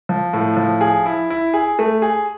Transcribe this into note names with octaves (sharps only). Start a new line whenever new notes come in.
F3
A2
F3
G#4
E4
E4
G#4
A3
G#4